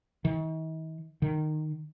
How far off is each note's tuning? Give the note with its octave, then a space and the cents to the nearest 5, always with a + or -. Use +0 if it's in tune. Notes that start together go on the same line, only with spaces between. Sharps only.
D#3 +45
D#3 -15